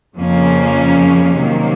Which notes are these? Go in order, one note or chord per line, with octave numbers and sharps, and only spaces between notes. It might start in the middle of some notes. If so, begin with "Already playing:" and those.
F2 C#3 F3 A#3 C#4
C3 D#3 F#3 A#3